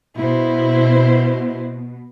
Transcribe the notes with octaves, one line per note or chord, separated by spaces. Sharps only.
B2 E4 C5